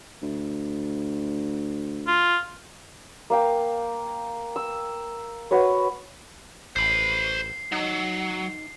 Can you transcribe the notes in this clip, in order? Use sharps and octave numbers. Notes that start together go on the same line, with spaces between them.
D2
F4
A#3 F5 G5
E6
F#4 B4 C#5
A1 C5 B5 C7
F#3 D#4